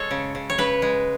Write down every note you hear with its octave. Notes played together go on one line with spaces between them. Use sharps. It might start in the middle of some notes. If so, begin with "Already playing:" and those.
Already playing: G#3 A4 C#5
C#3
C#3
C#5
C#3 B4
G#3